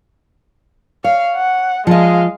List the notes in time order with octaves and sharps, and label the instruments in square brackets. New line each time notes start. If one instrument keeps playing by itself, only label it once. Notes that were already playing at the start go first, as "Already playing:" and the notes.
[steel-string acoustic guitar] C#5 [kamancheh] F5
[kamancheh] F#5
[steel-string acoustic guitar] F3 D#5 [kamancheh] G#3 F5